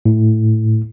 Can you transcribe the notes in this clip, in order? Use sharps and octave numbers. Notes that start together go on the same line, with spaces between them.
A2